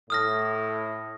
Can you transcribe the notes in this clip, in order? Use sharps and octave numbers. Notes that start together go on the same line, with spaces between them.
A2 D#6 F6 A#6